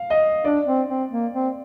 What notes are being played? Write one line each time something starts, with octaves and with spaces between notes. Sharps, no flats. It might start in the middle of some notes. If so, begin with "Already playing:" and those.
Already playing: F5
D#5
D4 D5
C4
C4
A#3
C4